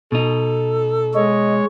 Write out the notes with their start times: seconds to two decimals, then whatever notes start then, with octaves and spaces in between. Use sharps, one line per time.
0.12 B2 D#4 A4
1.14 G#3 C#5 D#5